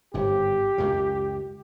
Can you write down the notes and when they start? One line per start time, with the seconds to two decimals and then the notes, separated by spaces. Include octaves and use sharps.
0.14 G1 G#2 G4
0.78 C#2 F#2 C#3